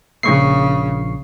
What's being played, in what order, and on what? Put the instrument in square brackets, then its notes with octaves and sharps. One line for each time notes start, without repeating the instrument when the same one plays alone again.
[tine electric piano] A#1 C#6 C7 [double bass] C#3